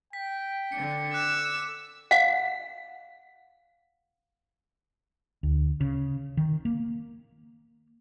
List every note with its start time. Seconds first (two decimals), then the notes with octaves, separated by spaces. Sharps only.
0.13 G5 B6
0.72 D3 D4 C#7
1.13 D6 E6 F#6 E7
2.11 F5 F#5
5.43 D2
5.81 C#3
6.37 D#3
6.65 A#3